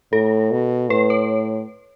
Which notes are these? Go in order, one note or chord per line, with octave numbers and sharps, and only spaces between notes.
A2 A4
B2
A2 B4
C#5